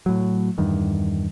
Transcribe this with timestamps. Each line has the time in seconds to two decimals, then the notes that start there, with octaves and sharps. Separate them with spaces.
0.06 A2 F#3
0.58 E2 G2 D#3